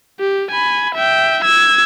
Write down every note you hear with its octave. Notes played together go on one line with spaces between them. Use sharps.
G4
G#5 B5
E5 G5
E6 G#6